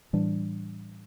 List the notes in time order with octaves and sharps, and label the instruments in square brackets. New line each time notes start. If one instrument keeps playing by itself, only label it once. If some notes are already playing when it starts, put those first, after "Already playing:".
[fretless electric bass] A2 E3 G3 D4